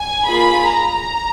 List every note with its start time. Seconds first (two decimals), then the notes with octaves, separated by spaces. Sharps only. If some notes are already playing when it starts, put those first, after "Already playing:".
Already playing: G#5
0.26 A#3 F4 G#4 B5
0.69 A#5